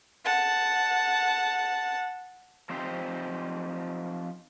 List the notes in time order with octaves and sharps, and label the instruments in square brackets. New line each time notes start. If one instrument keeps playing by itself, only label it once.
[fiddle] F#5 A5
[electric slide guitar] F3 C4 D#4 G4 C5